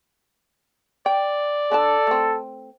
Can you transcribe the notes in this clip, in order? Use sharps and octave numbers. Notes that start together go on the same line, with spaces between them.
D5 G5
D3 D4 A4 A5
A3 C4